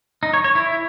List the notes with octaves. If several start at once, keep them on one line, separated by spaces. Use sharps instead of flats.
D#4
C#5
C#5
E4